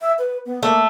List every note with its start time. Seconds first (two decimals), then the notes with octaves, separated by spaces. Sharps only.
0.01 E5
0.18 B4
0.46 B3
0.63 A3 A#3